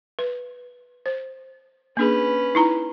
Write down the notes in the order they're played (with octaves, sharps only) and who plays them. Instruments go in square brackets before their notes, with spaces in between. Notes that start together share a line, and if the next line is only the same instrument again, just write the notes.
[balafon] B4
C5
[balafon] A#3 D4 G#4 [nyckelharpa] C#4 B4
[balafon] D#4 E4 A#5